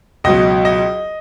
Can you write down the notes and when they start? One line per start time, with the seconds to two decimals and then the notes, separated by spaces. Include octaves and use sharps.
0.24 C#2 B2 F#3 D#5
0.65 D#5